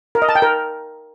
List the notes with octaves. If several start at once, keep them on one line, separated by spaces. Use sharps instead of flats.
A#4
D#5
A5
G5
A#4